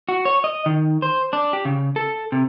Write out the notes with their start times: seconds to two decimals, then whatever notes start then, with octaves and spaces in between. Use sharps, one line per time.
0.09 F#4
0.25 C#5
0.44 D#5
0.66 D#3
1.02 C5
1.33 D4
1.53 G4
1.65 C#3
1.96 A4
2.32 C3